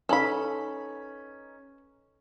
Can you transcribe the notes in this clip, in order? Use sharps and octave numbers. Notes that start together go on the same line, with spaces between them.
C#4 D#4 A4 B4 B5